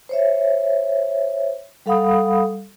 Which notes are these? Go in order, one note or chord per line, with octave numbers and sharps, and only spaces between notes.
C5 C#5 E5
G3 A4 F5 F#5 B5 D#6